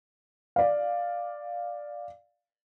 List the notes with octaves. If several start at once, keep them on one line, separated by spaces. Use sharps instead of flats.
D5 F5